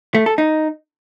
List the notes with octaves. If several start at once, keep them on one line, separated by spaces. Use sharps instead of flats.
A3
A4
D#4